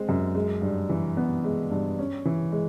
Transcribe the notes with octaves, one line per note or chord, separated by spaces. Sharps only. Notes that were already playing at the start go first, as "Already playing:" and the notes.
Already playing: G#3 C4
F#2
G#3
G2
E3
B3
G#3
G2
C#4
E3
G#3